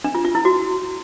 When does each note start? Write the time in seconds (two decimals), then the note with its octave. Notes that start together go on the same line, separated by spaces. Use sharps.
0.04 D4
0.15 F4
0.25 F4
0.35 E4
0.45 F#4